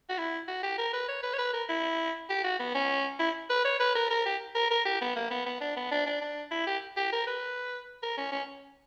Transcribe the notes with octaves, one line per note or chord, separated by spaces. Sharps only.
F#4
E4
F#4
G4
A#4
B4
C#5
B4
C#5
B4
A#4
E4
G4
F#4
B3
C#4
E4
B4
C#5
B4
A#4
A#4
G4
A#4
A#4
G4
B3
A#3
B3
B3
D4
B3
D4
D4
D4
E4
G4
G4
A#4
B4
A#4
C#4
C#4